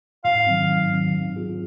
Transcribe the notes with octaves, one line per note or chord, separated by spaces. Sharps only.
G#2 F5
D#3 F#3 C4
G#2
D#3 F#3 C4
G#2
F#3 C4 F4 G#4